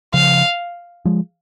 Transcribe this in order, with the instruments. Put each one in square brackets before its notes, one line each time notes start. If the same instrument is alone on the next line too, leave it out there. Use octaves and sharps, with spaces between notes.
[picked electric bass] C#3 F3 [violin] F5
[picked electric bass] F3 G#3